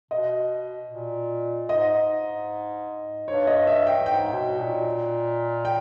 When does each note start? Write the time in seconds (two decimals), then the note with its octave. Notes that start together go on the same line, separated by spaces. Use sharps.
0.11 B2 D#5
0.90 A#2
1.69 G#2 D#5
3.28 G2 C#5
3.47 D#5
3.67 E5
3.87 G5
4.06 G#2 G5
4.33 B2
4.60 A#2
5.65 G5